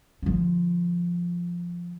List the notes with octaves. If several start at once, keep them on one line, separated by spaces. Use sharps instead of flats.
D3 F3